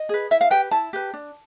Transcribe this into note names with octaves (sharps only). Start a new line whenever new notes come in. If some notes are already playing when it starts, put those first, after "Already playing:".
Already playing: D#5
G#4 B4
E4 E5
F5
G4 B4 G5
E4 A5
G4 B4
D4